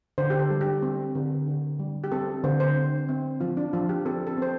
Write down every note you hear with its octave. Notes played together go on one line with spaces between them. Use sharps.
D3 C5
G4
A4
G3
G4
C4
D3
D3
G3
G4
C4 A4
D3 C5
C5
C4
C4
F3 F4
D4
F3 F4
G4
C4 A4
A4
C4 C5